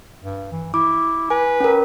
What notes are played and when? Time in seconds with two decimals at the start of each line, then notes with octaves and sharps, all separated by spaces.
0.24 G2
0.52 E3
0.74 E4 D6
1.30 B4 G#5
1.60 C#4 A#4